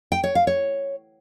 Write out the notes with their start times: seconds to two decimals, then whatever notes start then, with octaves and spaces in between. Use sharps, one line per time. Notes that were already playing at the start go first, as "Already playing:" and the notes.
0.12 G5
0.24 C#5
0.35 F5
0.47 C#5